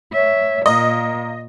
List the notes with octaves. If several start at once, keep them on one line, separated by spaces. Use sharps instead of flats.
C#5 E5
A#2 A#3 D#5